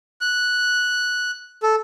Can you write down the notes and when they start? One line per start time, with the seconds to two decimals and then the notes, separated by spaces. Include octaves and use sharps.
0.21 F#6
1.63 A4